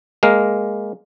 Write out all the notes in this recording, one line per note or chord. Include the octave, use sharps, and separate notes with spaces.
G#3 A#3 A#4